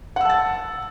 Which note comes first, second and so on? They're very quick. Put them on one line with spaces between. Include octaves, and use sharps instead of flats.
F#5 E6 A5 A6